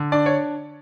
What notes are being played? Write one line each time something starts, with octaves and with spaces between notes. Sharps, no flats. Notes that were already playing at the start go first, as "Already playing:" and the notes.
Already playing: D3
D4 D5
C#5